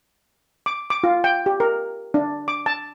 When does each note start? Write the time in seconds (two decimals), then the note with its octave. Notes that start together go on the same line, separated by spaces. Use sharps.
0.66 D6
0.90 D6
1.04 F4
1.24 G5
1.46 G4
1.60 A#4
2.14 D4
2.48 D6
2.66 A5